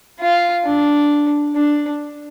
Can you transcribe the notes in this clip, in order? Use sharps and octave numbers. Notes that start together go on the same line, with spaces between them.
F4
D4
D4